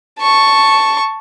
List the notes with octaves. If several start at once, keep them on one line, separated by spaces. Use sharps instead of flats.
A5 C#6